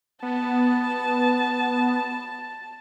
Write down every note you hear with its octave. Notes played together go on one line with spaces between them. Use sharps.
B3 A5